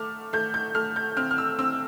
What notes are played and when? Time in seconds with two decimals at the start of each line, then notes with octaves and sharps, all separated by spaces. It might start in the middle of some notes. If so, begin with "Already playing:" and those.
Already playing: A3 D6 F6
0.33 A3 G6
0.54 G6
0.75 A3 F6
0.96 G6
1.17 C4 F6
1.31 F6
1.38 E6
1.59 C4 E6